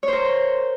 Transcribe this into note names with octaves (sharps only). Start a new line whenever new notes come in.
A#4 C5 C#5